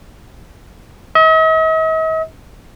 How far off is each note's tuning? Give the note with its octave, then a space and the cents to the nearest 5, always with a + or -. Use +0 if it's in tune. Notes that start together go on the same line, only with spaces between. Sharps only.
D#5 +45